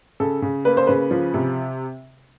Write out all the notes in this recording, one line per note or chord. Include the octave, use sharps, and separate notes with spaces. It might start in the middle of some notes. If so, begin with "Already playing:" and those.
C#3 A4
C#3
A#3 B4
C5
C#3 B4
F3
C3